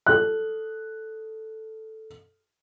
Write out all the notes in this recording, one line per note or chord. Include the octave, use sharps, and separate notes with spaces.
A4 F#6